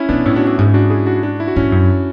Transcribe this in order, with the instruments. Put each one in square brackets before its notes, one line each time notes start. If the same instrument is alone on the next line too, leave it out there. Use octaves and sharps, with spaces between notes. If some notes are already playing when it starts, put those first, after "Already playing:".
Already playing: [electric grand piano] C#4 E4
[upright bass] B2 [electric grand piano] B3 D4
[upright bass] A2 [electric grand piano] C#4 E4
[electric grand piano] D4 F#4
D4 F#4
[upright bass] G#2 [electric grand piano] C#4 E4
[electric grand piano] D4 F#4
E4 G#4
D4 F#4
D4 F#4
E4
F#4
[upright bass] G#2 [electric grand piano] C#4 E4
[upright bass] F#2